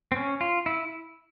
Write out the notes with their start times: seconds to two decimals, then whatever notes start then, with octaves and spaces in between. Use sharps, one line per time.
0.12 C4
0.16 C#4
0.41 F4
0.66 E4